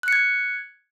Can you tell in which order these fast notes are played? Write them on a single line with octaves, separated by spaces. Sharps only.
F#6 C#7 G#6